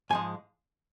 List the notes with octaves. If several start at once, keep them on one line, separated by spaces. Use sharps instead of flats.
G#2 F3 G#3 G#5